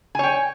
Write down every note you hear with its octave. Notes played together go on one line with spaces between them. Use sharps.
C#5 G5 G#5